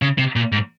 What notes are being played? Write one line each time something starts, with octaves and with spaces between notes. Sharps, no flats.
C#3
C3
A#2
G#2